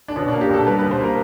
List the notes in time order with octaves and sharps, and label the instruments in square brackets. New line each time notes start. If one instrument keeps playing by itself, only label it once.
[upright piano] D4
B2 C#4
D4
A#3
G4
B2 A4
G3 B4
B4
B2
C5
A#3 A#4